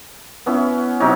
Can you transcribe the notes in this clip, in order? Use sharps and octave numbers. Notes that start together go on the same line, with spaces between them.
B3 C#4 E4
C3 F#3 D#4 C#5